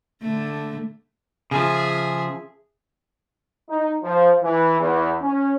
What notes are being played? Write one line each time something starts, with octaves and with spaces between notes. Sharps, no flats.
D3 A3
C#3 F3 G#4 E5
D#4
F3
E3
E2
C#4